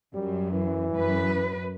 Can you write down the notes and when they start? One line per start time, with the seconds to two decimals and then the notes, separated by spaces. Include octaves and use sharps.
0.15 F#2 G3
0.52 E3
0.93 F#2 B4